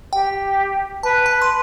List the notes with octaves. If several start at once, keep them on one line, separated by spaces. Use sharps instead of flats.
G4 G5
B4 A5
A5
C6